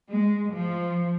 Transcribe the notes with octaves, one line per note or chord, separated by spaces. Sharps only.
G#3
F3